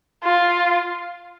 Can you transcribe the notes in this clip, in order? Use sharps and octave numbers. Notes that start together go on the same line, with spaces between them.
F4